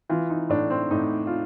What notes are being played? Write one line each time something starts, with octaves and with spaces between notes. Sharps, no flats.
E3 F4
D#4
A2 D4
C4
A2 D#4
F4